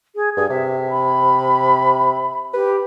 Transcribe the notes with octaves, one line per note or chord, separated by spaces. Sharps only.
G#4
G2 G#4
C3 E5
B5
G4 B4